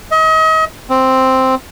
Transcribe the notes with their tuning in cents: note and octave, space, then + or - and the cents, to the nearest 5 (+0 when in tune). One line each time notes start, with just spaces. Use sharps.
D#5 +35
C4 +0